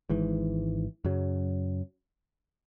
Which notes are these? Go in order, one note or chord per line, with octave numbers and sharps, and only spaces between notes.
G#1 G#2 E3
F#2 C#3 F#3